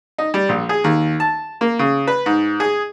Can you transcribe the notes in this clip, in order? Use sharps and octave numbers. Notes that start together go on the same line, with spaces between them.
D#4
G3
A#1
G#4
D#2
A5
A#3
C#3
B4
G#2
G#4